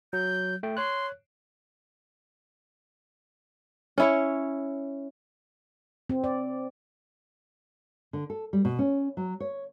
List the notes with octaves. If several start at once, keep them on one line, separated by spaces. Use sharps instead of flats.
F#3 G6
A3 G5
C#5 C6 F#6
C#4 E4 C#5
C4
D5
D3
A4
G3
B2
C#4
F#3
C#5